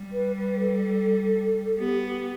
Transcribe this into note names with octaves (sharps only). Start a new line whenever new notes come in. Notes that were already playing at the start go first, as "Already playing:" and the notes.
Already playing: G3
B4
B4
A4
B3 G4
G4